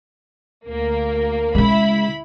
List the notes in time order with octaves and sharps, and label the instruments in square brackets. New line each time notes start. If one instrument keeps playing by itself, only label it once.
[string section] D2 A#3 A#4
[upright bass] C#3 G#3 [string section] E4 B5